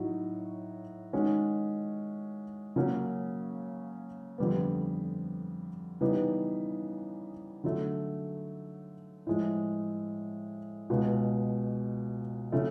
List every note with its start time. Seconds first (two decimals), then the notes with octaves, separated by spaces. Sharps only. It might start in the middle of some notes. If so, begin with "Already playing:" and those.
Already playing: A2 F#3 D#4 F#4
1.13 D#3 G#3 C#4 F#4
2.76 C#3 F#3 A#3 C#4 F#4
4.38 F2 D3 G3 B3
6.01 C#3 E3 G3 B3 D#4
7.64 D3 F#3 A3
9.27 A2 F3 G#3
10.90 C#2 B2 G#3 B3
12.52 C#3 F#3 A3